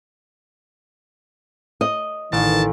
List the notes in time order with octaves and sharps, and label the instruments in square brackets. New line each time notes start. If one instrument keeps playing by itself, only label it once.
[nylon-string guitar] D#5
[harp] A1 [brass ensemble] D#3 E3 [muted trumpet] A5